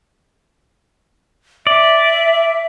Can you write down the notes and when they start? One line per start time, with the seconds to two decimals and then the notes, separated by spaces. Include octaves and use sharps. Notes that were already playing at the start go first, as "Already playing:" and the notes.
1.67 D5 E5